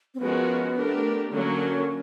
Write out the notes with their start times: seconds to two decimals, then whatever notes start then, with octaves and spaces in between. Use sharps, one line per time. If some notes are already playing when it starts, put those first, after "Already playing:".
0.15 C4
0.20 F3 G#3 B3 C#4 F#4 A#4
0.76 A3 D4 G4 A#4
1.33 D3 F#3 A#3 C#4